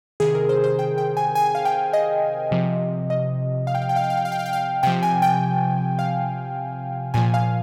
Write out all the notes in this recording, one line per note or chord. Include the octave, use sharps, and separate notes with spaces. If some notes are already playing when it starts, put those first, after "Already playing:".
C3 D#3 G#4
A#4
C5
C5
G5
G5
G#5
G#5
F5
G5
D#5
C3 F3
D#5
F5
G5
F5
G5
F5
G5
F5
G5
F5
G5
F5
G5
F5
C3 F3 G5
G#5
G5
F5
A#2 F3 G#5
F5